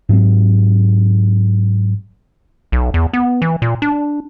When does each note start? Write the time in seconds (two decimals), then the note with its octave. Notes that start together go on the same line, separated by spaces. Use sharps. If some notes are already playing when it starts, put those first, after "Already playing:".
0.09 G#2 F#3 C4
2.72 B1
2.94 E2
3.13 B3
3.42 E3
3.62 A#2
3.82 D4